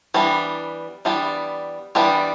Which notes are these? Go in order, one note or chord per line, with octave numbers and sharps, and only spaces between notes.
E3 G3 B3 D4 G4
E3 G3 B3 D4 G4
E3 G3 B3 D4 G4